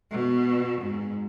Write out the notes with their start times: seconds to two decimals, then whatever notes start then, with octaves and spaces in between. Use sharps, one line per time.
0.11 B2
0.81 G#2